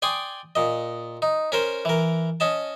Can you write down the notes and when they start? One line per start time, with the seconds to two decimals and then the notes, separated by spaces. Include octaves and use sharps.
0.02 D5 G5 G#5 C6 D#6
0.55 A#2 D#5
1.22 D#4
1.52 C#4 A#4 C5
1.85 E3 A#4
2.40 C#4 D#5 A5